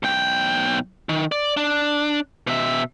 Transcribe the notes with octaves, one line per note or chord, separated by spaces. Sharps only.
B1 G5
D#3
D5
D4
B2 E5